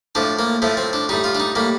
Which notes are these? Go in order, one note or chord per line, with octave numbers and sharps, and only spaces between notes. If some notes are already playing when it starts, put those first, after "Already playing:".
A2 F3 D4
A#3
A2 F3 A3
C4
D4
A2 G3 D#4
F4
D4
D#4
A2 G3 A#3